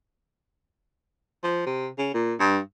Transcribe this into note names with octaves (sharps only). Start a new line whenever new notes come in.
F3
C3
C#3
A#2
G2